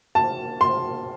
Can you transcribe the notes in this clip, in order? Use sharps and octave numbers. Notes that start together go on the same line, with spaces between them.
A5
C6